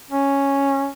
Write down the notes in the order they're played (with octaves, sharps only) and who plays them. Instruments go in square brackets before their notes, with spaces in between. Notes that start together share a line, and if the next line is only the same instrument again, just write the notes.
[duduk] C#4